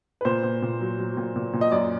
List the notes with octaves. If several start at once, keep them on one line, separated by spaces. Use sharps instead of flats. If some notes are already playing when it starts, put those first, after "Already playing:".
B4
A#2 C5
A#2
A#2
F#3
F#3
A#2
A#2
A#2
D#5
F#2 D5